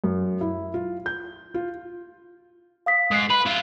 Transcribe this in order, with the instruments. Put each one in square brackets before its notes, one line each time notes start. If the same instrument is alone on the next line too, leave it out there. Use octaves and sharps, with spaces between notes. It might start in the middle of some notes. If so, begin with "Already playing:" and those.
[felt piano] F#2
E4
F4
G6
F4
[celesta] F5 D#6 B6
[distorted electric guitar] G#2 [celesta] D#6 F#6 C7
[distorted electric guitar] B4 [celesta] B5
[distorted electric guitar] E4 F4